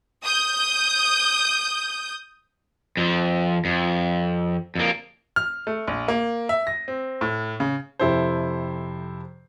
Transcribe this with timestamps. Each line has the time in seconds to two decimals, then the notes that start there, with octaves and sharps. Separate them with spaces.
0.24 D#6 G6
2.97 F2 F3
3.65 F2
4.75 F2 A#3
5.36 F6
5.67 A3
5.88 A#1
6.08 A#3
6.49 E5
6.67 A#6
6.88 C4
7.21 A2
7.60 C#3
8.00 F2 C3 E4 A4 C5